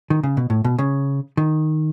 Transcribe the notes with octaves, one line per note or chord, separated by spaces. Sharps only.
D#3
C#3
B2
A2
B2
C#3
D#3